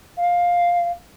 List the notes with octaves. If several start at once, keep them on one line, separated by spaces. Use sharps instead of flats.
F5